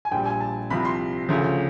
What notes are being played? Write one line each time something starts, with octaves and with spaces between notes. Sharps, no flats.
G#5
A#1 A#2 G3 G5
G#5
A5
C2 C3 F3 B5
C6
D2 C#3 F3